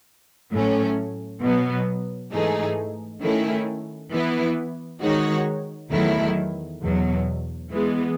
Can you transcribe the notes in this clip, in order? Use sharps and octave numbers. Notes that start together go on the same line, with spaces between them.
A2 F#3 A3 C#4
B2 F#3 B3
G#2 E3 A3 D#4 G#4
D#3 A3 C#4 E4
E3 B3 E4
D#3 G#3 D#4 F#4 C#5
E2 D#3 F#3 A3 E4
E2 B2 F#3
E3 G#3 B3